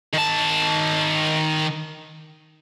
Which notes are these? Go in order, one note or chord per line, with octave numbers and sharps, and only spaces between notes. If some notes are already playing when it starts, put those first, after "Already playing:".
D#3 A5